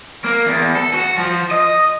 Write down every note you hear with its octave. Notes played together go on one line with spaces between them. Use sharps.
A#3
E2
A4
F#4
F3
D#5